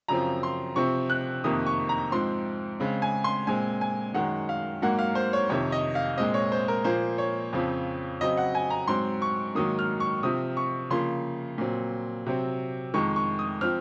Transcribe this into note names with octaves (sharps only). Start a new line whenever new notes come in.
F#2 C#3 F3 C4 A#5
C6
C3 F3 C4 C#6
F#6
F2 C3 D#3 A#3 D#6
C#6
A#5
G#2 F3 C4 C6
C#3 G#3 C4
G#5
C6
A#2 G#3 C4 G#5
G#5
F#2 D#3 G#3 F#5
F5
G#2 F#3 A#3 F#5
F5
C5
C#5
F2 C3 D#3 C#5
D#5
F5
A#2 G#3 C4 D#5
C#5
C5
A#4
A#2 F3 A#3 C5
C#5
F2 C#3 F3 C4
C#3 F#3 C4 D#5
F#5
G#5
A#5
G#2 F#3 C4 C6
C#6
G#2 D#3 F#3 A#3 D#6
F6
C#6
C3 F3 C4 D#6
C#6
C#3 F3 A#3 C6
A#2 F#3 C4
C3 F#3 C4
F2 D#3 G#3 C#6
C#6
D#6
F3 C4 F6